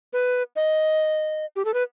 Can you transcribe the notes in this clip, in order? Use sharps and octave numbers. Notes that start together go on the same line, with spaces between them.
B4
D#5
G4
A4
B4